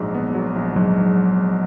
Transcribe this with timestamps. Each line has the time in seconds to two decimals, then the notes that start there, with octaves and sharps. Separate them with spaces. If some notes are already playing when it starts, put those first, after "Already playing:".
Already playing: A#1 G#2 F#3
0.14 B3
0.34 F#3
0.56 A#1
0.76 G#2 F#3